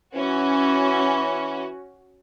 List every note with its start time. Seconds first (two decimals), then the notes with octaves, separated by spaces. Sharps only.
0.16 E3 C#4 F#4